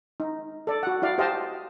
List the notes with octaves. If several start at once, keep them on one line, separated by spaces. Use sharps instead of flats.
D#4
A4 D5
F#4 F#5
E4 F#4 D5 F5
G4 C5 D#5 F5 G5 A5